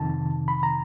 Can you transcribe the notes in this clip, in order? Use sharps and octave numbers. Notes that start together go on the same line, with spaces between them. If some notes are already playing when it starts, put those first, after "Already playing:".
Already playing: F2 C3 D#3 A5
B5
A#5